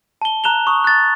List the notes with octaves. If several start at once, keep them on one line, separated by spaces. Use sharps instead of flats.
A5 G7
A#5 F#6 E7 F7 G7
C#6 D#6
F#6 A6